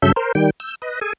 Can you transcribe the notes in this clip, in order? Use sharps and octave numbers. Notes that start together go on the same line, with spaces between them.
G2 C#3 F#3 A4 E5 G6
A#4 C5
D#3 G3 G5
E6 G6
B4 D#5
G#4 A4 G#5